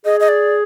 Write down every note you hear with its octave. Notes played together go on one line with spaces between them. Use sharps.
G#4 D#5
D#5
D5